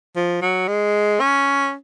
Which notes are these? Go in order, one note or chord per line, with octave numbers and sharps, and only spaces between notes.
F3
F#3
G#3
C#4